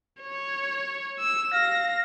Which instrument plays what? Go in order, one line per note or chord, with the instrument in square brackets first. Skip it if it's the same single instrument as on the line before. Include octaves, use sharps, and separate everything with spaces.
[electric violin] C#5
E6
[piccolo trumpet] F5 [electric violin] A#6